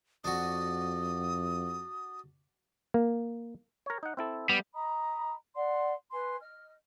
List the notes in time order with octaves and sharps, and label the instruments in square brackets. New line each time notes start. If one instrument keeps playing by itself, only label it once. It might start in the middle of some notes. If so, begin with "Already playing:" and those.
[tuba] F2 [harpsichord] D4 F#4 [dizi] D#6
[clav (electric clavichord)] A#3
A#4 C#5
D#4 F#5
C4 E4 A4
[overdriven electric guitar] G3 [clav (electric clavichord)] B3
[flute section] D#5 A#5 B5 D#6
D5 F#5 C6
B4 G#5 C6
D#5 F6